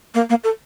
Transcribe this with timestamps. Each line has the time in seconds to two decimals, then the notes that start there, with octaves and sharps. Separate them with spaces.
0.15 A#3
0.30 A#3
0.44 A4